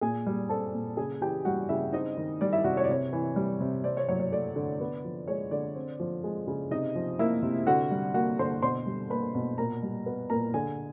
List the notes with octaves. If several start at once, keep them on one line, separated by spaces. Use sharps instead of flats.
A#2 G#4 G#5
G3
C4 A4 A5
A#2
C#3 G#4 G#5
E3 G4 G5
G3 F#4 F#5
C#3 E4 E5
C4 D#4 D#5
D#3
G3 D5
E4 E5
C3 F#4 F#5
C#5
D5
C3 C#5
E3
G3
C3
C4 D5
C#5
F#3 C#5
C#5
A3 D5
D3
B3
F3
G#3 C#5
D3 D5
C4
F3
G#3
C#3
C3 D#4 D#5
F3
A#3 E4 E5
C3
D3 F#4 F#5
G3
A#3 F#4 F#5
D3 C5 C6
B2 C5 C6
G3
A#3 B4 B5
B2
A#2 A#4 A#5
G3
B3
A#2 A#4 A#5
D3 G#4 G#5